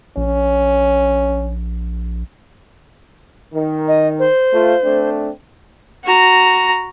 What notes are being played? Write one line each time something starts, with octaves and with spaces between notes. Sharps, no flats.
A#1 C#4
D#3
D#5
C5
A3 F4
A3 C4 D4
F#4 A#5